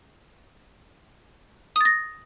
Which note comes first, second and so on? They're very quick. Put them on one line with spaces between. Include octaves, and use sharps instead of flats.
D#6 A6 A#6